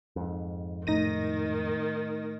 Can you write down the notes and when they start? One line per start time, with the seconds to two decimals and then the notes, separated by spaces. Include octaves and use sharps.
0.16 F2 G#2
0.87 A2 D#3 D#4 A#6 D#7